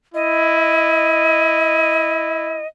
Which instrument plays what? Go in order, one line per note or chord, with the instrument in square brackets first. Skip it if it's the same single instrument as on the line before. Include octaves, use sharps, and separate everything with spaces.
[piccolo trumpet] E4 [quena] D#5